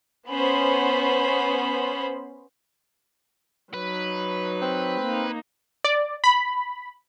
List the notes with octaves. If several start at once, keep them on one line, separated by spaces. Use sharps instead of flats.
B3 C#4 C5 B5
F#3 D#4 B4
C4
A#3 D#4
D5
B5